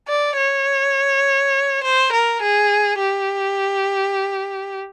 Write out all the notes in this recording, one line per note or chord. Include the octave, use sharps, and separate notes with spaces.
D5
C#5
C5
A#4
G#4
G4